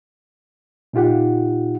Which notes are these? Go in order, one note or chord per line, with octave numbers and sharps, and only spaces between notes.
A#2 D#4 F4 G4 F#5